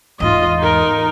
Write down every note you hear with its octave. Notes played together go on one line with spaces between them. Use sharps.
E2 G#2 F4 D#5
D#4 A#4